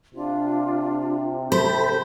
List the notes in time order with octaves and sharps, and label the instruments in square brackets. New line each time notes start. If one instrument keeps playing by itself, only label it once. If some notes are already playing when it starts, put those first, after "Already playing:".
[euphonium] C3 [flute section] D4 F4
[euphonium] C3 [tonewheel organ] A4 B5 [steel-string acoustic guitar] C5 [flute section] G6